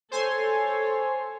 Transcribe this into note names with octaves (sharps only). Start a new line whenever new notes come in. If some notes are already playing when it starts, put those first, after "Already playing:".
A4 C5 C#5 G#5 C6